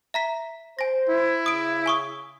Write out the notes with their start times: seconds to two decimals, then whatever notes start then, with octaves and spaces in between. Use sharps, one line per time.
0.14 E5 A#5 B6
0.79 C5 G#5 A#6
1.09 E4
1.46 C#3 D#6 D7
1.86 G#5 C#6 D#6